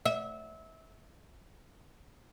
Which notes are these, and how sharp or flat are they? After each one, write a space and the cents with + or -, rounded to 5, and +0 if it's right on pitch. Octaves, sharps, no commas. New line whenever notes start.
E5 -25